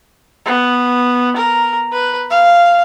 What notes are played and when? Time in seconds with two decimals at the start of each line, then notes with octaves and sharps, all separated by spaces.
0.46 B3
1.36 A#4
1.92 B4
2.30 F5